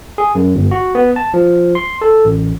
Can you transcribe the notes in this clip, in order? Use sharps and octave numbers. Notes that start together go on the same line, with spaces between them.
G#4
F#2
G1
F#4
B3
A5
F3
C6
A4
A1